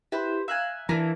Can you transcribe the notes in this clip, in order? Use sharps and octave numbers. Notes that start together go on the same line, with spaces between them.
E4 G4 B4 C5
E5 F5 G#5 A#5 F#6
E3 A#3 D4 A#5